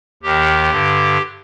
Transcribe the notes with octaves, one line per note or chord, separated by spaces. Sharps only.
D#2 D#3 G4
G2 D3